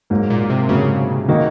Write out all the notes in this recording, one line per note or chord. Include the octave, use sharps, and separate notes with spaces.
G#2 F#3 A#3
A#2
C3
G#2 C#3 F#3 A#3
D#3 A#3 D#4 F#4